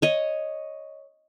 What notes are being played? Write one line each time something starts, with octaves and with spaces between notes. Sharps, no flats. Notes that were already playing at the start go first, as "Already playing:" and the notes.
C#5 D#5